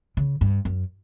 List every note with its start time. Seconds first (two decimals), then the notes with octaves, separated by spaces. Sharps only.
0.17 C#3
0.41 G2
0.65 F#2